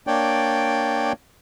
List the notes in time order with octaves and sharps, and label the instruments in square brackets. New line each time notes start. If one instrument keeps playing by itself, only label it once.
[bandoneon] A#3 D4 C#5 D5 G5